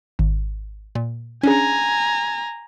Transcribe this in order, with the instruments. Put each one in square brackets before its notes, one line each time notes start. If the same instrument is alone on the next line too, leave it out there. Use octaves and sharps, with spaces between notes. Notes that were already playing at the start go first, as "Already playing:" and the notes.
[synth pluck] G#1
A#2
[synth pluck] C#4 D4 G#4 [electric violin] G#5 A#5